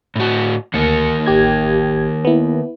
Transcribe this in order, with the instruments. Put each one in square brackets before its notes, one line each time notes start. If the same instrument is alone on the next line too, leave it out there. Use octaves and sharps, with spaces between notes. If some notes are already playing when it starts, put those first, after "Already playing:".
[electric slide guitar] A2 F#4
[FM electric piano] D2 C#7 [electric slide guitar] D#3 A#3 A#4
[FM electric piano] A1 G4 G#6
B3 E4